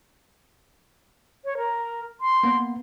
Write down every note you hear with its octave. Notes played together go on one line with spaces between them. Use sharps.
C#5
A#4
C6
A#3 B3